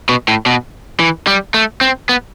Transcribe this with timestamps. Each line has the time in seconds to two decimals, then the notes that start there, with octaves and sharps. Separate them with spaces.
0.09 B2
0.28 A2
0.46 B2
1.00 E3
1.27 G3
1.54 A3
1.81 C4
2.09 B3